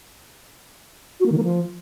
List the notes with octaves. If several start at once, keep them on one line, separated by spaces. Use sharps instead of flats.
F#4
A#3
D#3
A#3
F3